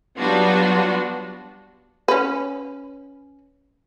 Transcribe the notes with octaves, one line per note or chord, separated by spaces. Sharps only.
F#3 G3 B3 D4 F4 F#4
C#4 B4